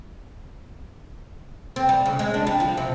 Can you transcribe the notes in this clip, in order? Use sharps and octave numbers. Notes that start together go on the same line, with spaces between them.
C4
G3
C#3
G#3
D4
G3
F3
C3